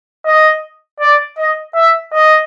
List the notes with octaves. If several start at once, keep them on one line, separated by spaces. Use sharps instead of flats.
D#5
D5
D#5
E5
D#5